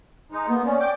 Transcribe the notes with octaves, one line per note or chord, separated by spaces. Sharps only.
G#3 D#4
A#3 B3
C#4 D5
G5 D6